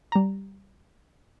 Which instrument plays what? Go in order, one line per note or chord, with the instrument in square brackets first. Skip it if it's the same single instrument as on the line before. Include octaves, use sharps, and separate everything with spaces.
[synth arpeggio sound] G3 A#5